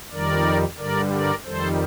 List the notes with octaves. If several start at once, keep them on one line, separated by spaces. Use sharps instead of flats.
F2 D#3 G3 A#4 D5
G2 D3 G3 A#4 D5
A#4 D5
F2 D#3 G3 A4 C5